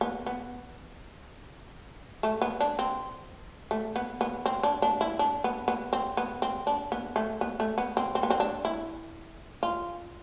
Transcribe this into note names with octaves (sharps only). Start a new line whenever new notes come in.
B3
B3
A3
B3
D4
C4
A3
B3
B3
C4
D4
D4
E4
D4
B3
B3
C4
B3
C4
D4
B3
A3
B3
A3
B3
C4
C4
B3
C4
D4
E4
F4